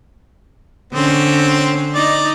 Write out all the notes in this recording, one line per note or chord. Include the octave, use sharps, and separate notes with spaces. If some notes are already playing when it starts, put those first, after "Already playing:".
D3 C4 C#4
D#4 D5